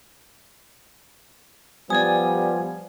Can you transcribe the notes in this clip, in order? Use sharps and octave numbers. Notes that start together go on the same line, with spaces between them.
F3 G3 B3 D5 G#5 D#6 G#6